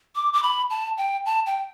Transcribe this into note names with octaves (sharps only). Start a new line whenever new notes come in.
D6
D6
B5
A5
G5
A5
G5